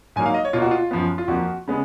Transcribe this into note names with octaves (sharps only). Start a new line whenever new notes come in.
G#2 F#3 A#3 G#5
F5
D#5
C#5
B2 A#3 F4
F#4
F4
F#2 F3 B3
F4
F2 F3 A#3 F#4
C#3 G#3 B3